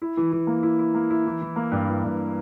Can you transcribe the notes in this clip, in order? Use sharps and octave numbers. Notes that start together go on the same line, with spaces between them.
E4
E3
E3
A#3
E4
E4
A#3
E4
E3
E3
A#3
G2
E3
G2